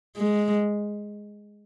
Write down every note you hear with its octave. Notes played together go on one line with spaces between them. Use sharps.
G#3